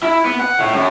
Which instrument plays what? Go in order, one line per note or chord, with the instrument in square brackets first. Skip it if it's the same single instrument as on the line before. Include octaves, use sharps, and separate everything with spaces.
[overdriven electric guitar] E4
B3
F#5
A2
F#2